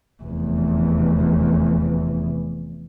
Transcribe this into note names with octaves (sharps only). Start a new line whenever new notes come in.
F1 E2